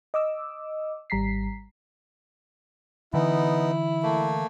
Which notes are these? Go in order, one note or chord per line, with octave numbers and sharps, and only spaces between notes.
D#5 D6 E6
G#1 G3 A#5 B6 C7
D3 E3 B3 D#4 E4
A3 A#3